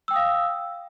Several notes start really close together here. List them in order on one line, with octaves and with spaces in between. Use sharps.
E6 G5 D#6 F5